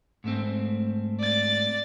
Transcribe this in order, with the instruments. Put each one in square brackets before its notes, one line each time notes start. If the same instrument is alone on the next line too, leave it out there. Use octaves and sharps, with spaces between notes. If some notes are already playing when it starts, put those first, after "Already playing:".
[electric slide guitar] G#2 A3 C4
[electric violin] D5 A6